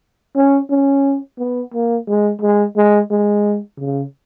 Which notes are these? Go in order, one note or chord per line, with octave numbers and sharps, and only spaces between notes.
C#4
C#4
B3
A#3
G#3
G#3
G#3
G#3
C#3